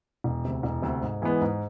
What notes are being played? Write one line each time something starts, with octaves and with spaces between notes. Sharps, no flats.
E1
D2 C3
E1
D2 C3
G#2
E3 G#3 B3
G#2